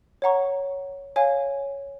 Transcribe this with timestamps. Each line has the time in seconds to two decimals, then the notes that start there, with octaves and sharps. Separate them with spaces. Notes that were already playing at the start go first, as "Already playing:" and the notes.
0.22 C#5 F#5 A#5 C#6
1.16 C#5 F5 G#5